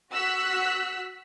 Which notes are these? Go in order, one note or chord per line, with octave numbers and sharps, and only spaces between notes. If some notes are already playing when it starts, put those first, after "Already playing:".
F#4 E6 F#6 B6